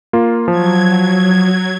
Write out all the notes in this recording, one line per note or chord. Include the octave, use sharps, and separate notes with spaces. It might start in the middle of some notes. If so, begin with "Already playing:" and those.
A#3 F4
F3 F#3 G#6